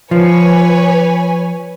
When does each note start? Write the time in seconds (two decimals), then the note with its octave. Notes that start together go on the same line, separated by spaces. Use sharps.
0.11 F3 B4 C#5 G#5